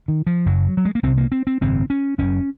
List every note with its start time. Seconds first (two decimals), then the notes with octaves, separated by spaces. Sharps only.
0.08 D#3
0.27 F3
0.46 F#1 F#2 C#3 F#3
0.77 F#3
0.85 G#3
0.95 A#3
1.03 C2 C3 C4
1.18 A#3
1.32 C4
1.47 C4
1.61 G#1 F#2 C#3 C4
1.90 C#4
2.18 F#1 F#2 C#3 C#4